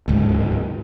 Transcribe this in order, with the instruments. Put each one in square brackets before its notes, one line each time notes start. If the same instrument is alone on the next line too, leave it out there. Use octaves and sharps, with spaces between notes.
[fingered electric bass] D1 C#2 G#2